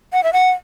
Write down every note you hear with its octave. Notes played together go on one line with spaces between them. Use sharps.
F#5
E5
F#5